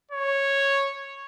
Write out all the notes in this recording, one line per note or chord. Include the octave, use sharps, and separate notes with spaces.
C#5